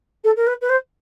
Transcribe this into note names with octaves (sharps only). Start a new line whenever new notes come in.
A4
A#4
B4
B4
C5